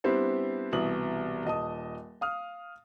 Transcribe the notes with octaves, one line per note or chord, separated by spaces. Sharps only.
G3 B3 C4 D4 E4 C5
C2 B2 E3 D#6 F#7
D#1 D#5 A5 D#6
F5 D#6 F6